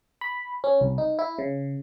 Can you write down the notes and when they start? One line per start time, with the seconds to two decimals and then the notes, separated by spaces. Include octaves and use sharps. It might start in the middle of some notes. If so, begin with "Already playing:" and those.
0.21 B5
0.64 C#4
0.81 C2
0.98 D#4
1.19 E4
1.39 C#3